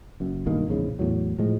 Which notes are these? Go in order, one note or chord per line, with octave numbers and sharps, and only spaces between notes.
F#1 F#2
B1 G2 D#3 A#3
A#1 E2 G#2 C#3
E2 A2 F#3
A2 F3 G#3